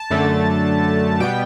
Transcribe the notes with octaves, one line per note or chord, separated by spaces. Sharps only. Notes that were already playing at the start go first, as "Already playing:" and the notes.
Already playing: A5
F#2 D3 A3
B2 G3 B3 G5